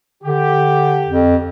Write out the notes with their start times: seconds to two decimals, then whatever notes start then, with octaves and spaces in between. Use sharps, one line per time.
0.23 D3 G4
1.07 F2